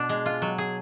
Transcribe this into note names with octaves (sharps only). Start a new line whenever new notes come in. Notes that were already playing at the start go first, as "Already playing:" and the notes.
Already playing: B2 D4
G#3
F4
F#3
G#4